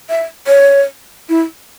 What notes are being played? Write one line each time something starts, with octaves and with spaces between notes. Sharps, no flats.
E5
C#5
E4